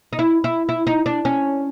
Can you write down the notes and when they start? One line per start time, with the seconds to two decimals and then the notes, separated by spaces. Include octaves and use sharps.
0.13 D#4
0.19 E4
0.44 E4
0.69 E4
0.87 D#4
1.06 D4
1.25 C#4